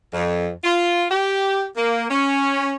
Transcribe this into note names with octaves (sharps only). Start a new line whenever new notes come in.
F2
F4
G4
A#3
C#4